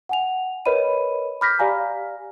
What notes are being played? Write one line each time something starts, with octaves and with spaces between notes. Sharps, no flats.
F#5 G#5 F7
A#4 B4 C#5 D#5 B5 D#7
B5 D6 F6 G6 A#6 B6
G4 D5 F5 G#5 A#5